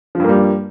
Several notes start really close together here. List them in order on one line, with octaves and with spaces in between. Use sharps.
F3 G2 A#3 G3